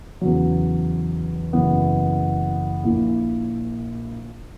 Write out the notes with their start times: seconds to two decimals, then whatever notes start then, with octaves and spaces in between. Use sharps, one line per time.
0.21 E2 C#3 F#3
1.53 F#1 F#2 C#3 E3 B3
2.83 A#1 A#2 A#3 E4